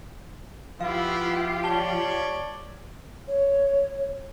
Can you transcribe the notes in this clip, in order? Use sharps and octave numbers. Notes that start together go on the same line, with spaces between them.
F3 B3 E4 F4 G4 F5
C#5 D5 A5 G7
C#5